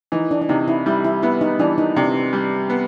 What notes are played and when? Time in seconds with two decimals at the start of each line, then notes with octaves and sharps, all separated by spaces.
0.12 E3 D#4
0.31 D4
0.41 D4
0.49 C3 D#4
0.68 E4
0.86 G3 E4
1.04 E4
1.23 B3 E4
1.41 D#4
1.59 E3 D4
1.78 D#4
1.96 C3 D4
2.33 G3
2.70 B3